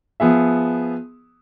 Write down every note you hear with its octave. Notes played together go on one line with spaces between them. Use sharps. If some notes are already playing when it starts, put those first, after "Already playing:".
F3 B3 G#4 E5